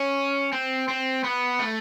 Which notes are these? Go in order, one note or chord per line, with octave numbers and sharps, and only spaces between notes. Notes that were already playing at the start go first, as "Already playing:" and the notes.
Already playing: C#4
C4
C4
B3
A3